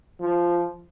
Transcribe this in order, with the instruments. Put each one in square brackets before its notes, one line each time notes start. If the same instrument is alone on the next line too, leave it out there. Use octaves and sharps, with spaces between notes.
[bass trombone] F3